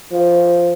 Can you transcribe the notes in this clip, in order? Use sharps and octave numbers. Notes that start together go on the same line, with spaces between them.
F3